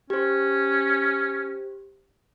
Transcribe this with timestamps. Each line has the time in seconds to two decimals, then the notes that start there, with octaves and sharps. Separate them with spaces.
0.10 C#4 G4 C5